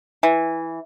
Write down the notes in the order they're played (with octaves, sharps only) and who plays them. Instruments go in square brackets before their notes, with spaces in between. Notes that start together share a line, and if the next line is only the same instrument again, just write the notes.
[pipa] E3